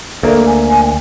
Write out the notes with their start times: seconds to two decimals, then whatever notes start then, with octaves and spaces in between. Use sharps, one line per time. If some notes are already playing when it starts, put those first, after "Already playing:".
0.23 D2 A#3 A4
0.46 G#5